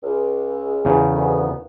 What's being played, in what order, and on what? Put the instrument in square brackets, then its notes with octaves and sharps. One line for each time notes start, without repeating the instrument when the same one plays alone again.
[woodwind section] C#2
[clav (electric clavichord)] E2 C#3
[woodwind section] D2 D#3 B3